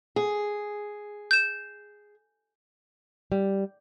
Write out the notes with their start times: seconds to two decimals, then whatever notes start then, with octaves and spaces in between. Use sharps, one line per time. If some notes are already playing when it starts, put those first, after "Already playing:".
0.16 G#4
1.31 G6 E7
3.32 G3